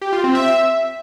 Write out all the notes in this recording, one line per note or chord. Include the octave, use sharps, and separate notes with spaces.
G4
F4
C4
E5